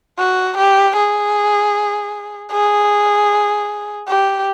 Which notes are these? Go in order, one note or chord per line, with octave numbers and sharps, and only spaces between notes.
F#4
G4
G#4
G#4
G4